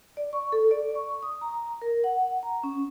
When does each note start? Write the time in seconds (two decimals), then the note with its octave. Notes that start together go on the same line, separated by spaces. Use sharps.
0.17 D5
0.33 C#6
0.52 A4
0.71 D5
0.95 C#6
1.22 D#6
1.41 A#5
1.82 A#4
2.04 F#5
2.43 A#5
2.63 C#4